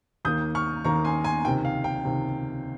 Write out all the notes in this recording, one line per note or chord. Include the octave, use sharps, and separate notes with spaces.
D#2 D#3 A#3 D#6 G6
C#6 F6
D#2 D#3 A#3 A#5 C#6
G#5 C6
G#5 C6
C#2 C3 D#3 G5
F5
G5
C#2 C3 D#3